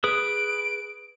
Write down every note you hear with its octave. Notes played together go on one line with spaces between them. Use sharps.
G#4 B4 D#6 D7